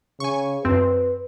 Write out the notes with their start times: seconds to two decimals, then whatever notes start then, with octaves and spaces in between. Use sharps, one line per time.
0.20 C#3 G#5 C#6
0.65 F#2 C4 B4